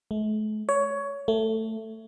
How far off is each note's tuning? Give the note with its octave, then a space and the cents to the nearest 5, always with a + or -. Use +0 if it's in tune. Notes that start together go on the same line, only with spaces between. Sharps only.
A3 -45
C#5 +15
A3 +10